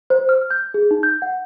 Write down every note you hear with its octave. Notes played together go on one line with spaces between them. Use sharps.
C5
F6
G6
G#4
D#4
G6
F#5